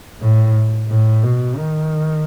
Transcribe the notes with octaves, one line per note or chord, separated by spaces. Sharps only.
A2
A2
B2
D#3